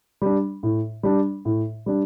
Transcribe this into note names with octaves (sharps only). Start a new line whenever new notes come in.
G3 D4
A2
G3 D4
A2
G3 D4